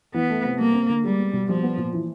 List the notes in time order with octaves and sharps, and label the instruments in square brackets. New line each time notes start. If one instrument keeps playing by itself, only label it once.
[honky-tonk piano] E3 [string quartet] B3
[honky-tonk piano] A3
C3
[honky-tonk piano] G3 [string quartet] A#3
[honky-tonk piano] C4
D3
[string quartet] G3 [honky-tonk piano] G#3
[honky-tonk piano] B3
B2
[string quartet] F3 [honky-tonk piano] G3
[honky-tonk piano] B3
A#2
E3